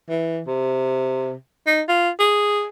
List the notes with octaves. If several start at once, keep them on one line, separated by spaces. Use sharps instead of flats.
E3
C3
D#4
F4
G#4